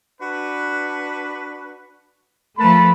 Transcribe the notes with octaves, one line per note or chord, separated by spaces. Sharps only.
D4 F#4 B4
F3 A3 A#4 B4 A5 B5